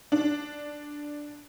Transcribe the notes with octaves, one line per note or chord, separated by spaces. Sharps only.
D4